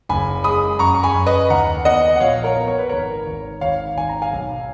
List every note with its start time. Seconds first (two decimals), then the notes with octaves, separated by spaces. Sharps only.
0.09 F#1 G#5 B5
0.44 G#3 B5 D#6
0.79 F#2 A#5 C#6
0.95 C#6
1.03 G#5 B5
1.15 F#2
1.26 B4 D#5
1.50 D#2 F#5 A#5
1.85 B3 D#5 F#5
2.16 F#5
2.20 A#1 C#5 F5
2.44 A#4 C#5
2.56 B3
2.68 C#5
2.78 B4
2.89 G#1 A#4 C#5
3.27 G#1
3.61 G#1 C#5 F5
3.96 G#1 G#5
4.09 A#5
4.22 F5 G#5
4.32 B1